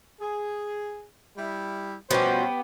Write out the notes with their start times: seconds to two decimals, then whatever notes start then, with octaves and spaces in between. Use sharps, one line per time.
0.21 G#4
1.37 G3 E4
2.11 B2 F3 G3 B3 C#4 G4 C5